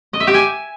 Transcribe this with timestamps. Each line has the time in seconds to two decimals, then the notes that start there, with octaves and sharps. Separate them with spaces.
0.13 D#5
0.20 E5
0.27 G4
0.34 G#5